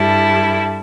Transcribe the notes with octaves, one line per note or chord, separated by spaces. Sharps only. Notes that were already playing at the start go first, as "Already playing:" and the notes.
Already playing: G2 G3 E4 A4